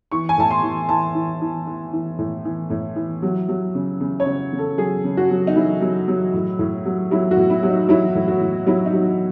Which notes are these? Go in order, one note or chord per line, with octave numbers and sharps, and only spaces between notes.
E3 C#6
G#5
A2 A5
C6
E3
E3 A5
E3
E3
E3
E3
A2
E3
A2
E3
F#3
F#3
C#3
C#3
C#5
C#3
C#3
A4
F#3 G#4
C#3
F#4
F#3
D#4
F#3 E4
F#3
F#3
A2
A2
F#3
F#3 E4
F#4
A2
E4
F#3
D#4
F#3 E4
A2
F#4
A2
F#3 E4
D#4
F#3